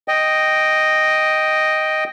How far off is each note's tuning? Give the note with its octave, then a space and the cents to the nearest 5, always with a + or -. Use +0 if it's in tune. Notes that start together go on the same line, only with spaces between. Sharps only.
D#5 +0 G5 +0